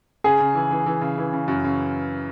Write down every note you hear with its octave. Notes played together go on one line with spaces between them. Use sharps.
C#3 G#4
C#3
E3
E3
E3
C#3
E3
C#3
F#2
C#3